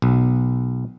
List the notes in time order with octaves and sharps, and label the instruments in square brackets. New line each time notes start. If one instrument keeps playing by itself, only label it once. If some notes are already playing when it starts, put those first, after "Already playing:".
[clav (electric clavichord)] B1